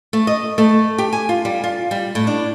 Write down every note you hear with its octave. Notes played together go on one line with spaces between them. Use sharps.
A3
D#5
A3
G4
G#5
F4
G3
F4
G3
A2
D4